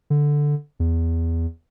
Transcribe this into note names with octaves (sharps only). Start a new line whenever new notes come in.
D3
E2